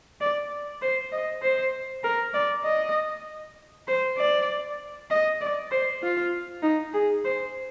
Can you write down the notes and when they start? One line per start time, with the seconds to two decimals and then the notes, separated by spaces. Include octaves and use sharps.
0.21 D5
0.82 C5
1.12 D#5
1.42 C5
2.04 A#4
2.34 D5
2.65 D#5
3.88 C5
4.18 D5
5.10 D#5
5.41 D5
5.71 C5
6.02 F4
6.63 D#4
6.94 G#4
7.25 C5